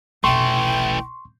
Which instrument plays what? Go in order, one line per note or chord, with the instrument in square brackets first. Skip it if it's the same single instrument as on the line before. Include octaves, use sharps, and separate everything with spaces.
[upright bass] F1 B1 [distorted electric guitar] E3 A3 [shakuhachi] G5 [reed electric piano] C6 C#6